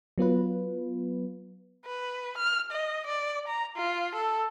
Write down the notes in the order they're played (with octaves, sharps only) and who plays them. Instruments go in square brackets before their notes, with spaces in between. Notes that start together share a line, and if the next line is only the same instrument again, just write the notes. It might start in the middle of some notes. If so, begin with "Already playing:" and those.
[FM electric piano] F#3 B3 F4 B4
[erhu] B4
F6
D#5
D5
A#5
F4
A4